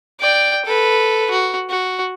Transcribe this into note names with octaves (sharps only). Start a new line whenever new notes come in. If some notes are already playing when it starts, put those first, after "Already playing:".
D5 G5
A4 B4
F#4
F#4